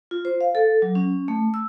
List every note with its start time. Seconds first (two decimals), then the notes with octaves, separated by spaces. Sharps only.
0.11 F4
0.25 C5
0.41 F5
0.55 A4
0.82 F#3
0.95 C#4
1.28 A3
1.54 E6